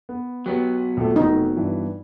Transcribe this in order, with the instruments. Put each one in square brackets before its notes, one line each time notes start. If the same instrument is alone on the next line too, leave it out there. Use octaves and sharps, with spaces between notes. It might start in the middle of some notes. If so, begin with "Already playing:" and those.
[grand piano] B3
[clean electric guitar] F#3 B3 [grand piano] G4
[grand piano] A#1 A3
[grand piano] F1 [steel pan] D#4
[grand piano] G2 E3